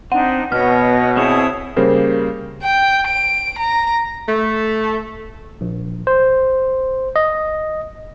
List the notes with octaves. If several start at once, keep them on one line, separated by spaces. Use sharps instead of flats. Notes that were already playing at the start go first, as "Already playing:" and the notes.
C4 D4 D#4 F#5
B2 B3 C#5 D#5 F6
C4 E4 G#4 A4 C#5 D#6
C#3 G3 A#3 A#4 C5
G5
D7
A#5
A3
A#1
C5
D#5